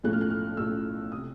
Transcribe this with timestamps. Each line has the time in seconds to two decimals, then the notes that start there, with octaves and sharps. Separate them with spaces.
0.03 B1 A2 F3 A3 C#4 F#6
0.13 F6
0.21 F#6
0.30 F6
0.57 B1 A2 F3 A3 C#4 E6
1.12 C3 D#6